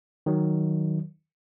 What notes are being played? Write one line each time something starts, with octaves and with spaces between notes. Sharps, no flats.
D#3 F#3